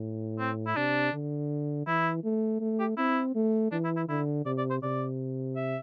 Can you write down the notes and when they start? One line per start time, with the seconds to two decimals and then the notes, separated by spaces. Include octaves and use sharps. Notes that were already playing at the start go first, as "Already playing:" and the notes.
Already playing: A2
0.39 C4
0.67 E4
0.77 C3 D4
1.13 D3
1.87 E3 E4
2.24 A3
2.61 A3
2.80 G4
2.97 C4 E4
3.35 A3
3.71 E3 D4
3.84 E4
3.96 E4
4.09 D3 E4
4.46 C3 D5
4.58 D5
4.70 C5
4.82 C3 D5
5.56 E5